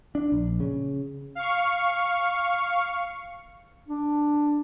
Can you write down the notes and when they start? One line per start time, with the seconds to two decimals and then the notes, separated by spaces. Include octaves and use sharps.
0.15 D4
0.32 A#1
0.60 C#3
1.35 F5 C#6
3.88 D4